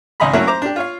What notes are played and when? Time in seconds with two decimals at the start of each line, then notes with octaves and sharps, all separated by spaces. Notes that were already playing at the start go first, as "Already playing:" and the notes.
0.20 G#1 C#2 D#5 G#5 A#5 B5
0.33 F#3 A3 A#3 C#4 E4 F#4
0.47 C5 A#5 D6
0.62 D4 G4
0.76 F4 C#5 F5